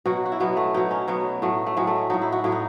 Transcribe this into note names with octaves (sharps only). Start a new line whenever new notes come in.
B2 F#3 F#4
F#4
E4
B2 F#3 B3
A3
B2 F#3 D#4
C#4
B2 F#3 B3
A2 F#3 A3
A3
A2 F#3 G#3
A3
A2 F#3 D#4
E4
F#4
A2 F#3 E4
D#4